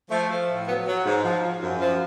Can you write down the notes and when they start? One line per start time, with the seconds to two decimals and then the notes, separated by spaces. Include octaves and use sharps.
0.09 F3 A3
0.29 F3
0.48 A2
0.66 F#3 B3
0.87 F#3
1.05 G#2
1.24 F3
1.42 F3
1.63 F#2
1.80 F3